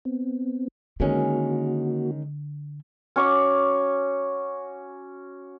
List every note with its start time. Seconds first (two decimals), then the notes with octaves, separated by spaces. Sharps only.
0.05 B3 C4
1.00 D3 D#3 G#3 A#3 C#4 F#4
3.16 C#4 F#4 C#6 D6